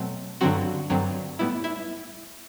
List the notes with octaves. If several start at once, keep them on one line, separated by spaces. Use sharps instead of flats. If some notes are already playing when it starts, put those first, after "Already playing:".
Already playing: B2 F#3 A3 C4
G2 D3 F#3 C4 F#4
G2 D3 F#3 C4
A2 G3 B3 E4
E4